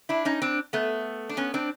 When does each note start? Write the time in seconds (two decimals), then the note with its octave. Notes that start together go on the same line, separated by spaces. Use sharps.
0.09 D4 E4
0.25 C#4 D#4
0.42 C4 D4
0.73 A3 B3
1.29 D4
1.37 B3 C#4
1.54 C4 D4